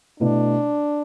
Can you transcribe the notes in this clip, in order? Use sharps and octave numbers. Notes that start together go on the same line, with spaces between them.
B2 A3 D4 E4 B4